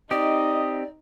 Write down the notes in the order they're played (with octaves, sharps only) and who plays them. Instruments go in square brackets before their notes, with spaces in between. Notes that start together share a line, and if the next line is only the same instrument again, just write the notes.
[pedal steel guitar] C4 G4 [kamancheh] D#4 [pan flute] D5 [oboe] D#5